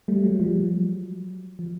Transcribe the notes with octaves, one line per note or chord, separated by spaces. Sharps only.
G3 A3
F#3 G#3
F3 G3
F#3
F3